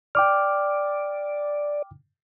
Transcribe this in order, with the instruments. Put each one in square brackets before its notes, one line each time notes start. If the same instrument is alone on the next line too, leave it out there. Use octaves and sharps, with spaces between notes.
[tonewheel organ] D5 [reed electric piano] G5 D6 F6